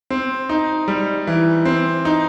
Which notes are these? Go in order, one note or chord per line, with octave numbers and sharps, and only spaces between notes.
C4
D#4
G3
E3
C4
D#4